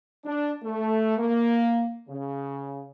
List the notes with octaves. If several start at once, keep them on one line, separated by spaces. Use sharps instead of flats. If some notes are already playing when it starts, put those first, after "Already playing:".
D4
A3
A#3
C#3